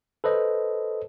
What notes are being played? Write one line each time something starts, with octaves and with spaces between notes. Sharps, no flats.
A4 B4 C5 D#5